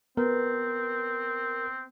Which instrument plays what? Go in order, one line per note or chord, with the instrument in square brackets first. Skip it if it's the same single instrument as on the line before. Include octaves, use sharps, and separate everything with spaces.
[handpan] B3 [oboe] C4 [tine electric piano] A#4